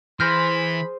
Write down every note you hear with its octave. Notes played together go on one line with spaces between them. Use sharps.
E3 G#4 C5 B5 F6 G6 A#6